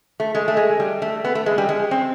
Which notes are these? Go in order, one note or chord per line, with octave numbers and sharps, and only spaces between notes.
A3
G#3
A3
G#3
G3
A3
B3
A3
G#3
G3
G#3
C4